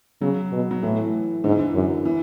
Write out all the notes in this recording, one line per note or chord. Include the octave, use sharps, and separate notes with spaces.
C#3 F#3
B2
F#3
A2 E3
G#2 D3
E3
D3
F#2
E3